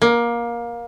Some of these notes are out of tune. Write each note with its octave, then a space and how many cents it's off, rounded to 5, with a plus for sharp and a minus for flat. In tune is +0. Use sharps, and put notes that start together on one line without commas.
A#3 +20